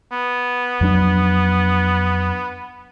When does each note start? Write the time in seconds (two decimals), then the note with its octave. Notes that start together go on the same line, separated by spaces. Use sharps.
0.12 B3
0.81 F2 F#3 D4